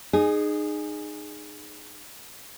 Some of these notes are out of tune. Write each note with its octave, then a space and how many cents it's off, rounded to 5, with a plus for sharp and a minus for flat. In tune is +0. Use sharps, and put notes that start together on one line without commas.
D#4 -30 G#4 +0